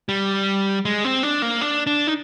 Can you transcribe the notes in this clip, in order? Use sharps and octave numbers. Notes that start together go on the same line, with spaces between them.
G3
G#3
C4
D4
A#3
D4
D4
D#4